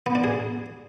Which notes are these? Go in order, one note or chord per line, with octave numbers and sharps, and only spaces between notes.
B3
D4
G#4